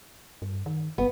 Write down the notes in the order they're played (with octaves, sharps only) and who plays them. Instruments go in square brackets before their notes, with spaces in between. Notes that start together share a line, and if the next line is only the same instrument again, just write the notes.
[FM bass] G2
D#3
[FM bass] G1 [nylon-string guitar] B3